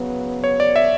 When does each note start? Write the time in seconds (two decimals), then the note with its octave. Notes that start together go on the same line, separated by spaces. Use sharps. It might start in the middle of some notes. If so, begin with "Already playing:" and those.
Already playing: C#3 F#3 B3
0.44 C#5
0.60 D5
0.76 E5